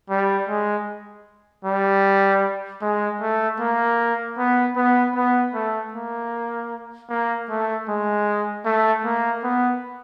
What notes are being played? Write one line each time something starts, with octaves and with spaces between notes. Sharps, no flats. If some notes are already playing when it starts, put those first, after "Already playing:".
G3
G#3
G3
G#3
A3
A#3
B3
B3
B3
A3
A#3
A#3
A3
G#3
A3
A#3
B3